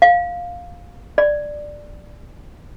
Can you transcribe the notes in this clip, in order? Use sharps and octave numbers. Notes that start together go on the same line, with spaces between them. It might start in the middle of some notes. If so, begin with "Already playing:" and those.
F5
D5